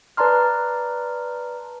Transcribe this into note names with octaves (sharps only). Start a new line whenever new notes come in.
B4 D5 A5 A#5 C6 F6